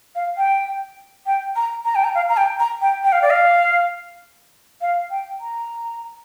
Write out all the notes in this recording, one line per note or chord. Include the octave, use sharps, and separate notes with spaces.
F5
G5
G5
A#5
A#5
G5
A#5
F5
A#5
G5
A#5
G5
G5
F5
D5
F5
F5
G5
A#5